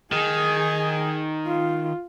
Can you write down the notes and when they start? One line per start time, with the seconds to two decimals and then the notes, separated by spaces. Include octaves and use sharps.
0.12 D#3 G#4 G#5
1.47 F4